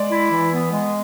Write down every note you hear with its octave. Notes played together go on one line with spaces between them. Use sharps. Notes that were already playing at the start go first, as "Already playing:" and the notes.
Already playing: G#3 D5
E4
E3
B3
G#3